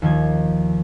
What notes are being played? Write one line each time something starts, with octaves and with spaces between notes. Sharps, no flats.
D#2 D#3 F3 G#6